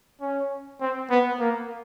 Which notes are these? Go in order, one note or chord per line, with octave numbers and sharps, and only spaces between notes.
C#4
C4
B3
A#3